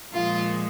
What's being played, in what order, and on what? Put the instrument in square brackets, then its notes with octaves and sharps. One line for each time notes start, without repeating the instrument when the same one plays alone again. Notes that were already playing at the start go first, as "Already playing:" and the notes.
[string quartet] A#2 F3 G#3 F4